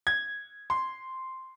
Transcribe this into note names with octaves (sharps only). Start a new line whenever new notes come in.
G#6
C6